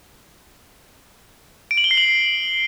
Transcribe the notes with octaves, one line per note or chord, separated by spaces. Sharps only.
D7
F#7
G7
C7
F#7